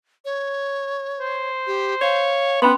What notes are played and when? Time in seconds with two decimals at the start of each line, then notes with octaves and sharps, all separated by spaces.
0.25 C#5
1.20 C5
1.67 G4
2.02 C#5 F5
2.62 B3 C#4 B5 C6